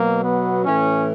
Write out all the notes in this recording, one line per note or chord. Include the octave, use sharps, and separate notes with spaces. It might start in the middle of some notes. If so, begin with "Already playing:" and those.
Already playing: B2 F#3 A#3
B3
A2 E3 C#4